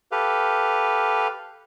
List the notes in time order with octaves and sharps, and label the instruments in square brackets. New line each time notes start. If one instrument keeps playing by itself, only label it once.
[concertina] G4 A4 B4 F5